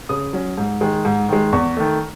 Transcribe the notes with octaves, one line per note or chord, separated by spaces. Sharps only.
C#3 D#6
F#3 C#4
G#2
D#3 G#3
G#2
D#3 G#3
E2 C#6
D#3 A3